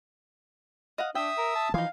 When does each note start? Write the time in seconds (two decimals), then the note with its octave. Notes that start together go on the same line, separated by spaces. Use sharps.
0.98 D#5 F5 F#5
1.15 D4 E5 G5 D#6 E6
1.38 A#4
1.55 A5
1.74 E3 F3 D#4 F5 G#5